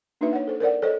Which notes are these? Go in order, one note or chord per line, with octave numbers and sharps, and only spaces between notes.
A#3 D4 D#4 F#4 B4 E5
C#5 F#5
A4 C5
A#4 C5 D5 F#5
A4 C5 C#5 D#5